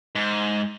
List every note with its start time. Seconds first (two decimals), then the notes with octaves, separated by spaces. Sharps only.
0.15 G#2